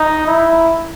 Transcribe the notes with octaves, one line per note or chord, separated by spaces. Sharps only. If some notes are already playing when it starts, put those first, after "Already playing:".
Already playing: D#4
E4